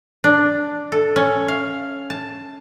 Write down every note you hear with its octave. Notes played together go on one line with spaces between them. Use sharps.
D4
A4
C#4
F5
A5